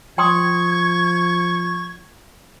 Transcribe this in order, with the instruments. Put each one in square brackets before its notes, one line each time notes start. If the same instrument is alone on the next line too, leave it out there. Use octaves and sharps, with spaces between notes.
[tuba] F3 [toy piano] G5 C6 D#6 [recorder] C#6 [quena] G#6